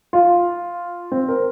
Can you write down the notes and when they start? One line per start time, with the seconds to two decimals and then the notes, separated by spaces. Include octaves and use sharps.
0.13 F4
1.12 C4
1.28 A#4